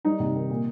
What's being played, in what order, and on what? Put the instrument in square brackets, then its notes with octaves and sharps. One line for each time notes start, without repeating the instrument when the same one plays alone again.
[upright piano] G3 D#4
C3
D#3
A#2